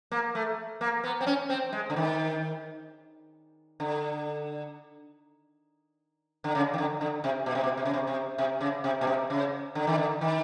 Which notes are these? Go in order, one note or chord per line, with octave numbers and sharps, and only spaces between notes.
A#3
A3
A#3
B3
C4
C#4
C4
G#3
D3
D#3
D3
D3
C#3
D#3
D3
D3
C3
B2
C3
B2
C3
C#3
C3
C3
C3
C#3
C3
B2
C3
C#3
D3
D#3
D3
D#3